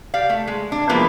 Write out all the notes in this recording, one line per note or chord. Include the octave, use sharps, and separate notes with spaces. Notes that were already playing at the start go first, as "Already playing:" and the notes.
G4 D5 F5
A3
G#3
D4
E3 F3 G#3 A#3 B3